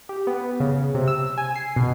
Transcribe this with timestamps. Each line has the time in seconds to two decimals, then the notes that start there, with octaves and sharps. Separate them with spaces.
0.09 G4
0.27 B3
0.60 C#3
0.95 C3
1.08 E6
1.38 G#5
1.56 C7
1.76 B2